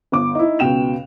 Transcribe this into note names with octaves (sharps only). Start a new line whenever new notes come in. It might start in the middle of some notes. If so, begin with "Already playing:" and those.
G1 D6
D#4 E4
C#2 B2 G5 E7 F7